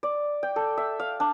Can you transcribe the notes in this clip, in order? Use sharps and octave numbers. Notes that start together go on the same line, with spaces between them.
D5
G5
A4
E5
F5
D4